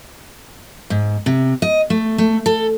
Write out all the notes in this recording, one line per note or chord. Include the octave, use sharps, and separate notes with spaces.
G#2
C3
D#5
A3
A3
A4